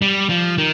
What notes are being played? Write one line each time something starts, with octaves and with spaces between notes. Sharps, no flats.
G3
F3
D#3